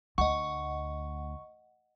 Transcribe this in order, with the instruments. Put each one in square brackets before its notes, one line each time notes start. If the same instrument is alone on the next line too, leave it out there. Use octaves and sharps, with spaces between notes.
[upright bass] D2 [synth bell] D#5 F#5 [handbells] C#6